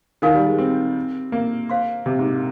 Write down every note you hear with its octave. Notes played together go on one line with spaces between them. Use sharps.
D#3 D#4 A#4 F5 G#5
G3
G#3
C4
A#3
C5 F5 C6
C3
G#2